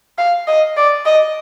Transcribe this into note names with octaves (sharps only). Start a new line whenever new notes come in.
F5
D#5
D5
D#5